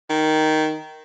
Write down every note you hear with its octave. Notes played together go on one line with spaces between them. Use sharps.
D#3